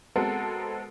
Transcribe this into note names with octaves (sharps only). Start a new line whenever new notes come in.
G#3 B3 C4 F#4 A4 A#4